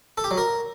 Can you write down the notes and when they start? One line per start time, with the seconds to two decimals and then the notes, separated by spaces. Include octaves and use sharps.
0.18 A4
0.24 G4
0.31 F#3
0.38 A#4